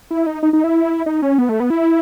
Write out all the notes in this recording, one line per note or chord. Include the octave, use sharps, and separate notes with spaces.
E4
D#4
D#4
D#4
E4
D#4
C#4
B3
A3
B3
E4